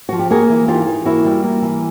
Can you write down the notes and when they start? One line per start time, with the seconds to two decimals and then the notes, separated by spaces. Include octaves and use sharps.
0.09 F3 F#4
0.19 G4
0.30 A#3 F#4 G#4
0.50 E3
0.68 D#4 F4 G4
0.87 E3
1.05 A#3 E4 F#4
1.25 G3
1.44 A#3
1.62 E3